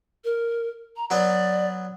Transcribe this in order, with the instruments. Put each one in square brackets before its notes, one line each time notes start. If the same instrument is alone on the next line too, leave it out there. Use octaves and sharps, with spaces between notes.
[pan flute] A#4
A#5
[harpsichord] F#3 B3 B4 [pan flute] D5